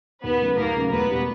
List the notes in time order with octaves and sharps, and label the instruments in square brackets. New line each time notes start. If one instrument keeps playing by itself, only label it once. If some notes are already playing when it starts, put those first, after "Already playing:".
[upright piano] D#2 [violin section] B3 B4
[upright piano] C#3 F#3 A3
[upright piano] D#2 [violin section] A#3 A#4
[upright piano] C#3 F#3 A3
[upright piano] E1 [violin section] B3 B4
[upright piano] B2 G3